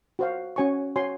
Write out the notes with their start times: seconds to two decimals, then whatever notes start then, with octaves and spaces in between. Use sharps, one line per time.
0.19 F#4 C5 F5
0.56 C#4 F#4 C#5 G#5 C#6
0.96 F#4 C#5 G#5 C6